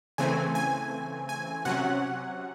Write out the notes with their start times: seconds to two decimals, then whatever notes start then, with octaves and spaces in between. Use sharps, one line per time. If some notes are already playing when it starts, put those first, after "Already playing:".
0.18 C#3 E3 A3 C4 G#5
0.55 G#5
1.29 G#5
1.65 C3 F#3 C#4 F#5